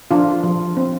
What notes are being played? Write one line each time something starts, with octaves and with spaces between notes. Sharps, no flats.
F3 D4 F4
F3
C4